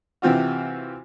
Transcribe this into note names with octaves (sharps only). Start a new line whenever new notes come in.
C3 E3 C4 F4 F#4